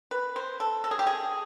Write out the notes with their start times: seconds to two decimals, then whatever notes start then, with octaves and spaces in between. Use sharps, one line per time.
0.11 B4
0.36 C5
0.60 A4
0.84 A4
0.91 G#4
0.99 G4
1.07 G#4